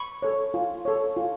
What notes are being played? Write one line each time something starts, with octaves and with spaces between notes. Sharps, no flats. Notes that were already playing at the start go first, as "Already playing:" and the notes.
Already playing: B5 C#6
A4 C#5
F4
A4 C#5
F4